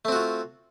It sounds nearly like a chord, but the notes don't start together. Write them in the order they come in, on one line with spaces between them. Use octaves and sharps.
A3 C4 F#4 F4